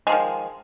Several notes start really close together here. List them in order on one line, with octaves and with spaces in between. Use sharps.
G#3 F3 D#3